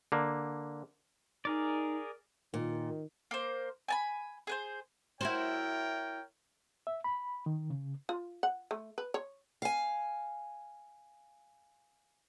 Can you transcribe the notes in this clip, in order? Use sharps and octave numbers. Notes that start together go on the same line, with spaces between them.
D3 A#3
D#4 G#4 A#4 D5
A#2 D#3
A#3 C5
G#5 A5 B5
G#4 B4 C5
E4 F#4 A#4 C5 C#5 G5
E5
B5
D#3
C#3
F4
F#5
A3
B4
C#5
F5 G#5